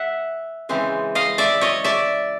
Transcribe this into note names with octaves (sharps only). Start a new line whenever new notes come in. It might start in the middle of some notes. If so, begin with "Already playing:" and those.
Already playing: E5 F#5
C#3 E3 G#3 C4
D#5 F5
D5 E5
C#5 D#5
D5 E5